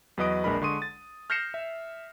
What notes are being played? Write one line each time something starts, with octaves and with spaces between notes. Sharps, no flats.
E2 F#3 B4 D#5 D#6 D7
A#1 G#3 D4 A#4 B5
D3 G#3 C6 C#6 D#6 D#7
A6
F6 G6 A#6 C7 C#7 E7
E5